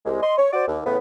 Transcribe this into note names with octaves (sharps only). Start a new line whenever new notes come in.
C2 G#3
D#5 C6
C#5
F#4 C5 D5
D#2
A2 C#3 E3 B3